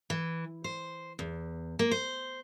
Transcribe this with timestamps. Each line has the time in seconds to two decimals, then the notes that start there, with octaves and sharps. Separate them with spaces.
0.10 E3
0.64 C5
1.19 E2
1.79 A#3
1.91 C5